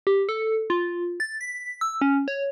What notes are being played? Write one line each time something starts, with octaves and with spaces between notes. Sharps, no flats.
G4
A4
F4
A6
B6
E6
C#4
C#5